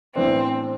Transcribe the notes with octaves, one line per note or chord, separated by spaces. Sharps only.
A2 E3 B3 C4 D4